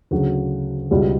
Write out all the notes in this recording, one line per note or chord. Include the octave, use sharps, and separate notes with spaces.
D2 C#3 F#3 F#4
C#2 B2 G3